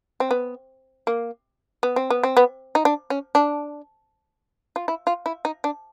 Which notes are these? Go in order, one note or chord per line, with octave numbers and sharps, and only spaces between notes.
C4
B3
A#3
B3
C4
B3
C4
B3
D#4
D4
C#4
D4
F4
E4
F4
E4
D#4
D4